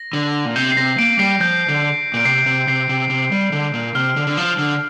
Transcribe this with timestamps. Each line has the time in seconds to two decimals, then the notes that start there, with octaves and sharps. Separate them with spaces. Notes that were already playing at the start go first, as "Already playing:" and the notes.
Already playing: A#6
0.13 D3
0.45 A#2
0.56 C3 G6
0.72 C7
0.77 C3 A#6
0.99 A#3 D7
1.19 G3 C7
1.40 F3 G6
1.68 D3
2.14 A#2 D7
2.25 C3 C7
2.46 C3
2.67 C3 C7
2.89 C3
3.10 C3
3.32 G3
3.52 D3
3.74 A#2
3.95 C3 F6
4.16 D3
4.27 D3
4.37 F3
4.58 D3